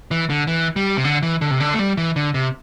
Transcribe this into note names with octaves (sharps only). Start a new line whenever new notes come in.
E3
D3
E3
G3
C3
D3
E3
D3
C3
D3
A3
G3
E3
D3
C3